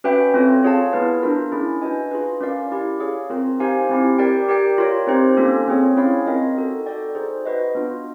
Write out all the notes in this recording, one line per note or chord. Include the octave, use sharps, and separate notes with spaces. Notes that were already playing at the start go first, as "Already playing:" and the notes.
C#4 F#4 B4 E5 G5
C4 F4 A4 C#5
F4 G#4 C#5 F5 A5
B3 E4 G#4 B4
D4 F4 A#4
C#4 E4 G#4
D4 F#4 B4 D#5 G#5
F4 G#4 B4
C#4 F4 A#4 D5 F5
C#4 E4 G4
G#4 C#5 F5
C4 F4 A#4
D#4 G4 C5 F5 G#5
C4 E4 G4
G4 A#4 D5 G5
G4 A#4 D5 G5
F4 A#4 C#5
C4 D#4 G4 C5
A#3 C#4 F4 A4
C4 F4 G#4 C#5
C#4 E4 G#4 C#5 F5
C4 F4 A#4 D#5
D#4 F#4 A4
F#4 A4 D5 G5
D#4 G#4 C5
F#4 B4 D#5
B3 D4 F4